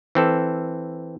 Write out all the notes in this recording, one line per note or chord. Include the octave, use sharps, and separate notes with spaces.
E3 C4 A4